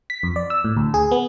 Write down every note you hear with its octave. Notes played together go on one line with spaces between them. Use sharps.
B6
F2
D5
E6
A2
D2
G#4
B3